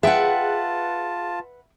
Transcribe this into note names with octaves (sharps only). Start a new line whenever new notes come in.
F4 G#4 B4 E5 F#5 G5 A5